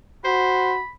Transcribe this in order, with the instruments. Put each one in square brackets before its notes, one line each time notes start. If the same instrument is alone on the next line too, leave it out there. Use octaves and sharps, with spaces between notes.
[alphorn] F#4 [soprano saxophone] C5 [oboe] B5